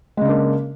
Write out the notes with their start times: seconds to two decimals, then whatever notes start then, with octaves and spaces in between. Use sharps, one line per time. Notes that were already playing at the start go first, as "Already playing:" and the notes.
0.17 G#3
0.21 C#3
0.25 D4
0.29 A#3